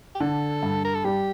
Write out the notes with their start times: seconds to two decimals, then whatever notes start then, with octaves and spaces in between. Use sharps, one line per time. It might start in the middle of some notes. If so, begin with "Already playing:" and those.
0.15 G4
0.20 D3 A4
0.63 G2
0.84 A#4
0.94 A4
1.05 G3 G4